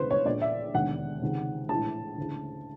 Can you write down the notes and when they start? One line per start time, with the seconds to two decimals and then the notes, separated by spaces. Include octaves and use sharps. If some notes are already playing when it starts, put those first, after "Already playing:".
Already playing: E1 D2 C#3 E3 B4 C5
0.11 C#5
0.25 A#1 A#2 D5
0.41 E5
0.74 E1 D#2 D3 F#5
1.22 C#2 C3 D#3
1.69 A#1 A2 E3 A5
2.18 D2 C#3 E3